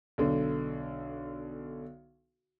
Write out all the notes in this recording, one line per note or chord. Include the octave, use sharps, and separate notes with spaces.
B1 D3